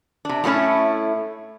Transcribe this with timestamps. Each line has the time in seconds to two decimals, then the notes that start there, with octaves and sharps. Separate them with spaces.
0.25 C3 D4
0.44 A2 F#3 A3 C#4 E4